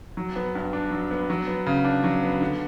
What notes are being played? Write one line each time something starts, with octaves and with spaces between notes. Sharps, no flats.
F#3
B3
G2
D4
F#3
B3
F#3
B3
C#3
D4
F#3
B3
D3